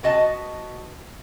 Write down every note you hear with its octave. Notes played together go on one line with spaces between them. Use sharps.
B3 F#4 D#5 A5